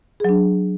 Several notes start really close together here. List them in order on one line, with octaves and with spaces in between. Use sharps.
G#4 F#3 D4